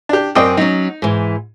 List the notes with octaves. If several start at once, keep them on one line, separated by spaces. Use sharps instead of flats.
D4 G4
F#2 C4 D5 D#5 G5
F#3 C#4 D#4
G#2 E3